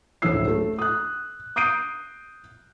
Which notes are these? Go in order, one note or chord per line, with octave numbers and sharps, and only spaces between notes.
F#1 D2 A2 E4 E6 C7
A3
D#6 F#6
D#6 G6 C7 D7 D#7